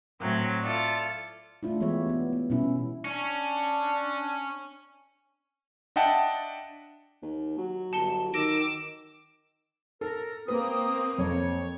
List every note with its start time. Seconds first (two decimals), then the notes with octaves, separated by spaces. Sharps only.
0.21 A2 F#3 C4
0.63 E4 F4 A4 D5
1.63 A3 D4 E4 F4
1.80 E3 G#3 B3 G4 C#5 E5
2.07 B3 D4
2.33 B3
2.50 B2 G3 C#4 E4
3.05 C#4 D4
5.96 D4 D#5 E5 F#5 G5 A5
7.23 D#2
7.58 F#3
7.93 G1 A5 C#7 G7
8.34 D#3 D6 E6 A#6 D7
10.01 A4 A#4
10.48 A#3 C4 B4 D#6
11.18 F2 C#5